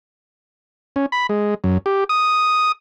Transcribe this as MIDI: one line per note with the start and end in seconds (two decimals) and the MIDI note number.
0.96 1.06 61
1.12 1.27 83
1.29 1.54 56
1.64 1.78 42
1.86 2.04 67
2.09 2.72 87